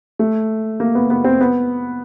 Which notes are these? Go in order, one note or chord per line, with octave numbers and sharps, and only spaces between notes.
A3
A#3
B3
B3
C4
B3